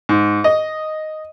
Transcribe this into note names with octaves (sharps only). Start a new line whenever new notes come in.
G#2
D#5